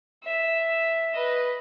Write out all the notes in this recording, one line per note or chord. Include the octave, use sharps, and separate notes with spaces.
E5
B4 D#5